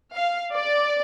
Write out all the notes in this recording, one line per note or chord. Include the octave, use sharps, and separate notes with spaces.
F5
D5